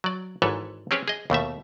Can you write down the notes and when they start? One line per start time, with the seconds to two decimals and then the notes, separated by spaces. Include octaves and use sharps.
0.04 F#3 D5
0.42 G#1 G#2 E3 A4 B4 C#5
0.91 C4 C#4 G4 G#4 B4 C#5
1.08 G#4 D#5
1.30 D#2 B2 A3 E5